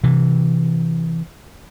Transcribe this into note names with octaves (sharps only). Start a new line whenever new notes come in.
C3 E3